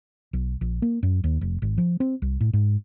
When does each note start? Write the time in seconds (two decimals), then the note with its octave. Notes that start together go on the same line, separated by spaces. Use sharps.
0.33 B1
0.61 A#1
0.82 A#3
1.03 F#2
1.24 D#2
1.41 F1
1.62 G#1
1.78 F3
2.00 C4
2.22 C2
2.41 A2
2.53 G#2